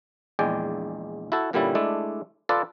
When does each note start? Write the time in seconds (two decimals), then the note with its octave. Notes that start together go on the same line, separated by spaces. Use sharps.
0.39 A#1 E2 G#3 D5 G5 G#5
1.32 E4 F#4 A4
1.53 G2 A#2 D3 G3 C#4 E4
1.75 G#3 A3 D4 E4 D5
2.49 F4 A4 B4 D5